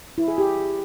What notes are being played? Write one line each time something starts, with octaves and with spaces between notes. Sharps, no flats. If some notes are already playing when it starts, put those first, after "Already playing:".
E4
G#4
G4